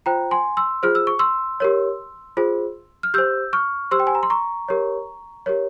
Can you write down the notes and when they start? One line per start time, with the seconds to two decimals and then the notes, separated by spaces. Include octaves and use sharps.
0.06 F4 C5 G5 A#5
0.31 G#5 C6
0.57 C6 E6
0.83 F4 G#4 C5 F6
0.95 E6
1.07 C#6
1.19 C6 E6
1.60 G4 A#4 C#5
2.37 F4 G#4 C5
3.03 F6
3.14 G4 C5 E6 G6
3.53 C#6 F6
3.91 G4 C5 C6 E6
4.00 G5
4.07 G#5
4.15 A#5
4.23 C6
4.30 A#5 C#6
4.69 G4 A#4 C#5
5.46 G4 A#4 C#5